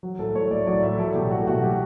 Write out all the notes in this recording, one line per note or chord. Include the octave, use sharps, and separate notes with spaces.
F#3
A2 A4
A3 C#5
A2 D5
F#3 D5
A2 E5
F#3 A4
B2 G4
A3 F#4
B2 F#4
F#3 G4